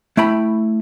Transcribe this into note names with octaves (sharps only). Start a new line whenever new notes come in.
A3 E4 G5 B5